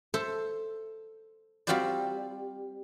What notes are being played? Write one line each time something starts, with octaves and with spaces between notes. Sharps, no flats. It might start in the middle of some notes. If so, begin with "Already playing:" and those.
A4 C5 E5
G3 C4 F4 F#4 C5 D5